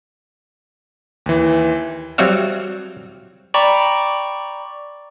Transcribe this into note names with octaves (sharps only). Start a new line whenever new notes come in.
D#2 E3
F#3 G3 C4 F#4 E5 F5
D5 G5 A#5 B5 C#6 D6